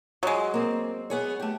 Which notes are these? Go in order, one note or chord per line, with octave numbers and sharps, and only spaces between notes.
F#3 G#3 D#5
A#3 C4
B3 G#4 C#5
A3 G4